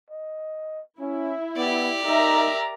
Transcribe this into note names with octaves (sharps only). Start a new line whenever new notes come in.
D#5
C#4 E4
B3 G4 D5
D#4 A#4 E5 A#5